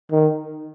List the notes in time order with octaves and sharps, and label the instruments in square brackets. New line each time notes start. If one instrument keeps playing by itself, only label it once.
[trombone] D#3